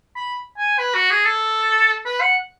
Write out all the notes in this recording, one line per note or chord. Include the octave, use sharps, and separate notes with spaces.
B5
G#5
B4
F#4
G#4
A4
B4
F#5